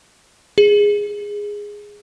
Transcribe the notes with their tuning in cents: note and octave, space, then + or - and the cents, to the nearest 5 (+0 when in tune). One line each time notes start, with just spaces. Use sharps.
G#4 -10